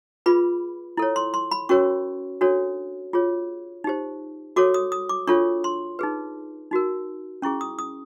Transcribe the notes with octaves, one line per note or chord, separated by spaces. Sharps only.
F4 G#4 B4 B5
E4 A4 C#5
C6
C6
B5
C#4 F#4 A#4 C#5 C#6
D4 F#4 A4 C#5
F4 G#4 C#5
D#4 G4 C5
F#4 A4 C#5 D6
D#6
D#6
D6
D4 F4 A4 C#5 C#6
C6
D#4 G#4 B4
D#4 F#4 A#4
C#4 E4 G#4 C#6
D#6
D#6